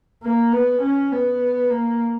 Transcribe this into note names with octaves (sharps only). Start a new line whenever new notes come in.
A#3
B3
C#4
B3
A#3